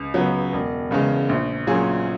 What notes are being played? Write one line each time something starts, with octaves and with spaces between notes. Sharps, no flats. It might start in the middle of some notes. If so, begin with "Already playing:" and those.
Already playing: C#2
C#3 F#3 B3
E1
E2 C#3 G#3
A#1
A#2 F#3 C#4 G#4